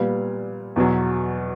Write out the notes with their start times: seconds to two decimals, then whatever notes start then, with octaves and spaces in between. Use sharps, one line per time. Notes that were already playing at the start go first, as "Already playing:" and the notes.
Already playing: A#2 G3 B3 F5
0.76 E2 B2 F#3